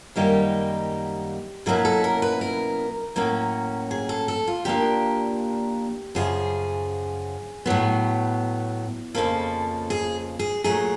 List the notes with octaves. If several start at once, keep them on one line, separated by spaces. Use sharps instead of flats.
F#2 D#3 G3 A#3 D#4 G4
B2 F#3 A#3 C#4 E4 G#4
A4
A#4
B4
A#4
A2 F#3 A#3 C#4
G#4
A4
A4
F4
A#2 F3 A#3 D4 G4
F#2 C#3 F3 G#4
A2 F#3 B3
F2 C#3 F3 A#3 A4
G#4
G#4
A#2 F#3 A3 G#4